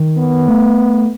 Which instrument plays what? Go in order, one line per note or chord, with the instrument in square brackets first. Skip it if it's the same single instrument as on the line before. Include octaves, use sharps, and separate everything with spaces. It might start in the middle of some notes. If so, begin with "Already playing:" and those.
Already playing: [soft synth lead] D#3
[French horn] B3
[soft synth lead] A3